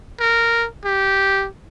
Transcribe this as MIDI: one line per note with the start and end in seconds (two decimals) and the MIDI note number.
0.20 0.67 70
0.85 1.48 67